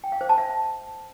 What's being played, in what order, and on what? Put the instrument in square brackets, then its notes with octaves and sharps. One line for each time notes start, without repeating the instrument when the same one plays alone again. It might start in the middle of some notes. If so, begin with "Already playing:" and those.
[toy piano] G5
F5
C5
A5
E5